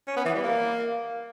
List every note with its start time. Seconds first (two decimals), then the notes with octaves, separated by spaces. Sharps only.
0.07 C#4
0.16 B3
0.25 E3
0.34 G3
0.43 A#3